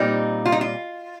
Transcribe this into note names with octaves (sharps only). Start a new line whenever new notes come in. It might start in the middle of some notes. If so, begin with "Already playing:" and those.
Already playing: A#2 G3 C4 D#4
F4
D#4
F4